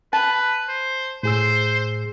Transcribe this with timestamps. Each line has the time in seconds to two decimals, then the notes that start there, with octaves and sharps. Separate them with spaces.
0.13 B4 A5
0.68 C5
1.23 A2 G#4 C5 E6